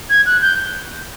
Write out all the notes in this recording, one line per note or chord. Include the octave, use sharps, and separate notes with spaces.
G#6
F#6
G6